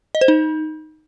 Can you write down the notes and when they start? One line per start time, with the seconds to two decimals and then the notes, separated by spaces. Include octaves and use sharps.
0.15 D#5
0.21 C5
0.28 D#4